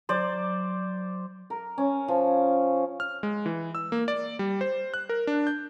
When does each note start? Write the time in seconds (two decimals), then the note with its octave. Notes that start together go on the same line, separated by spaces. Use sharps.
0.09 F#3 C5 D5
1.50 A#4
1.78 C#4
2.08 F3
3.00 F6
3.23 G#3
3.46 E3
3.75 E6
3.92 A#3
4.08 D5
4.39 G3
4.61 C5
4.94 F#6
5.09 A#4
5.27 D4
5.47 G6